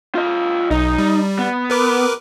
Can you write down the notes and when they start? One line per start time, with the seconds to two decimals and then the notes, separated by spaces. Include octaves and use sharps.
0.15 F4 D#5
0.71 B1 D#4
0.98 G3
1.39 B3
1.70 A#4 B4 D6